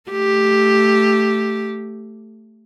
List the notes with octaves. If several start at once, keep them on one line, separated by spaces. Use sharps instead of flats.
A3 G4